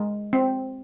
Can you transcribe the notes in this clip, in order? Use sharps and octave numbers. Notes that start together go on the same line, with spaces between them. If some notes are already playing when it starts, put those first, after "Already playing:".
Already playing: G#3
C4